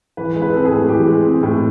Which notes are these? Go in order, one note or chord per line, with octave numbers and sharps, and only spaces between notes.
E3 B4
G#3
B4
C4 A4
G#4
A2
E3 G4
G#3
C4
A2